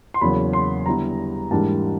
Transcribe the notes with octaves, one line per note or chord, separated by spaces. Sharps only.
C6
E2 C#3 F#3 A#3 B5
C6
D3 G3 B3 E4 A#5
G#2 E3 G3 A#3 D4 A5